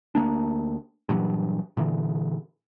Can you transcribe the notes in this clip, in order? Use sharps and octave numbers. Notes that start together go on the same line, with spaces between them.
D2 G3 A#3 D4
G2 A#2 E3 F#3
A#2 D3 E3